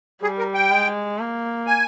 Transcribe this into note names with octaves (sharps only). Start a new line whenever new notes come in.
G3 G#4
A#4
G5
G#3
A#3
G#5